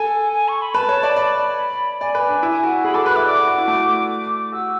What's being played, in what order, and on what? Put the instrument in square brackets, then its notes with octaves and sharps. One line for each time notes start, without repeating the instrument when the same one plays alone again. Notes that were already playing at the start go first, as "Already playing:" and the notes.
Already playing: [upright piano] A4 [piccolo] G#5
[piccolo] G#5
C#6
B5
[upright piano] B4 [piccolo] A5
[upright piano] C#5
D5
[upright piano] D5 [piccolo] B5
[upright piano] D5 [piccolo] G#5
[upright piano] B4
D4
E4
F#4
[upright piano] G#4 [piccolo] B5
[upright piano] A4 [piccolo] D6
[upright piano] B4 [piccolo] F#6
[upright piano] E5 [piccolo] D6
[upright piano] D5 [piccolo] D6
[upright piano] F#4
F#4
E4
A3
[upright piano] F#4 [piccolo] E6